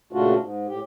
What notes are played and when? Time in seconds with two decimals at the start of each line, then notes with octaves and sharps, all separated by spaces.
0.13 A#2 C#3 A3 D4 F4 F#4
0.37 G#2
0.67 A2 G4